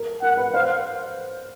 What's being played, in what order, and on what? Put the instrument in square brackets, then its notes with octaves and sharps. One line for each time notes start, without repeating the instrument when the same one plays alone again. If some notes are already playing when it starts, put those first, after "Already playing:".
Already playing: [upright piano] A#4
[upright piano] A#4 [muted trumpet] F#5
[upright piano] B4
[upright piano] C5 [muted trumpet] F5